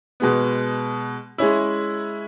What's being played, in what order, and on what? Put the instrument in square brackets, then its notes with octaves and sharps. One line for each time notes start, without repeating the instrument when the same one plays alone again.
[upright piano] B2 G#3 B3
G#3 C#4 E4